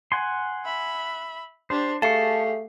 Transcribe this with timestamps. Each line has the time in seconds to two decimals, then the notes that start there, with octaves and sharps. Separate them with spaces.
0.12 F#5 G#5 C6
0.65 E5 B5
1.70 D4 G4 C5
2.02 A3 G4 G#4 F5 A5 C#6 C7